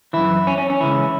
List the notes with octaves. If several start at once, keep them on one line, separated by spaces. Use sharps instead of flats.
F#2 E3 E4
C#4
C#4
C#4
C#2 C#3 E3 E4